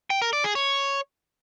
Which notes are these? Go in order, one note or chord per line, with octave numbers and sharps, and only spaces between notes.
G5
A#4
D5
G#4
C#5